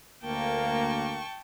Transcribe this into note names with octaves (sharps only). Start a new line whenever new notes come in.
D2 A#3 G5 A5 C#6